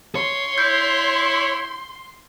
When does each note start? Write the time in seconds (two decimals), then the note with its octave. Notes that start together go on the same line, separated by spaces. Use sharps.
0.15 C#5 C6
0.58 E4 G6